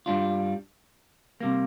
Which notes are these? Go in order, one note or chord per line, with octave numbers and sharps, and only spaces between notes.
G2 G3 D4 F4
C3 G3 A#3